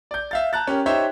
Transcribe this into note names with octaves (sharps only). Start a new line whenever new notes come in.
D5 G6
E5 F5 A6
A5 A#5 F#6 A6
C#4 G4 A#4
D#4 G4 C5 C#5 E5